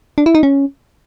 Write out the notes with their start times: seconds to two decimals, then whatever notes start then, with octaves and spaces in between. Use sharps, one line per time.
0.18 D4
0.26 E4
0.35 D#4
0.43 C#4